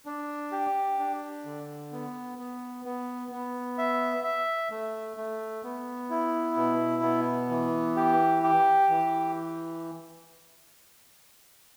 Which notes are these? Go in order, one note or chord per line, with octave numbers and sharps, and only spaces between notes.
D4
G4
D4
D3
B3
B3
B3
B3
E5
E5
A3
A3
B3
E4
B2
B3
E3
G4
G4
E3